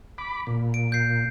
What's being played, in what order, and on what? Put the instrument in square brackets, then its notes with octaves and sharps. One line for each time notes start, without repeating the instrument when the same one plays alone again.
[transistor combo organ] B5 D6
A#2
[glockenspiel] D7
G6 C7